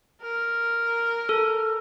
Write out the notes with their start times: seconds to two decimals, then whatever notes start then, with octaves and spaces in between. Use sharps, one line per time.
0.23 A#4
1.29 A4